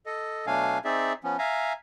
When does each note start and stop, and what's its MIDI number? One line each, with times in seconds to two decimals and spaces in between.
0.06 0.46 69
0.06 0.46 75
0.47 0.78 47
0.47 0.78 54
0.47 0.78 57
0.47 0.78 62
0.47 0.78 77
0.47 0.78 80
0.85 1.13 60
0.85 1.13 63
0.85 1.13 68
0.85 1.13 74
0.85 1.13 76
1.24 1.37 53
1.24 1.37 59
1.24 1.37 61
1.39 1.73 76
1.39 1.73 77
1.39 1.73 80
1.39 1.73 82